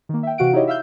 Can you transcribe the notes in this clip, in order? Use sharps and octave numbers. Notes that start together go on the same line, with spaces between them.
D#3 A#3
E5 G5
C3 E3 F#4 F5 F#5 D7
D#4 E4 G4 C#5 D#5
E5 F5 E6 F6 G6